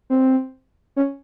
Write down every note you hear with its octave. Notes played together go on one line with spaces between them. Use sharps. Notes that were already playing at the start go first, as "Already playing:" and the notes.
C4
C#4